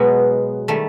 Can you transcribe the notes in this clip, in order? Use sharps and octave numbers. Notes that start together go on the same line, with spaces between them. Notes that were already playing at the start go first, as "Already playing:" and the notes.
Already playing: B2 F#3 G#3
D#3 G3 A3